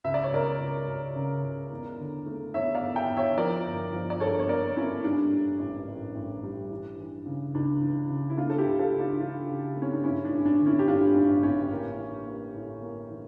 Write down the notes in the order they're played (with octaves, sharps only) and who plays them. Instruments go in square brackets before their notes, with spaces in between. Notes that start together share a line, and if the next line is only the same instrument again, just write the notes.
[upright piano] C#2 E5
D5
C#5
C#2 A#4 D5
C#2
C#2
C#3
C#2
E2
D3
A3
E2 C#5 E5
D5 F5
E2
E5 G5
E2
C#5 E5
F3 A#4 D5
G1
F3
D5
G2 A4 C#5
C#5
A#3 A#4 D5
A#3 C#4 E4
G3 D4
A2
A1
A1
A1
G3
E3
E3
C#3
C#2 D4
E3
C#3
E4
A3 D4 F4
A4
E4 G4
C#2
F4 A4
C#2
D4 F4
E3 D4 F4
C#3
A3
C#4
D4
G2 C#4 E4
D4
A1
D4
D3
C#4 E4
G4
G2 D4 F4
A1 D4
A1 C#4
A#3
E3
A#3
A2
A#3
E3